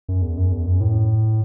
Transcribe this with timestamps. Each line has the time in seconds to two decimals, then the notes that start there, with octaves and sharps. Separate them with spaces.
0.09 F#2
0.22 E2
0.38 F#2
0.52 E2
0.67 F#2
0.81 A2